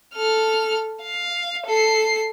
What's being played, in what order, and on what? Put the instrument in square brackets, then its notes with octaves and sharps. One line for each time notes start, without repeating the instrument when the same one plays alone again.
[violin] A4 F6
F5
A4 C7